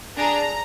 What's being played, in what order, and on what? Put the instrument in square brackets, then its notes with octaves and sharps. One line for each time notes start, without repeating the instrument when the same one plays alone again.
[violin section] D4 G#4 A#5